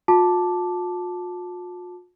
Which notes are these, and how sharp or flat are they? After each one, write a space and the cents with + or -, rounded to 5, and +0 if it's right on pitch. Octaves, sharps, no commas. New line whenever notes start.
F4 +45 A5 +0 D6 +0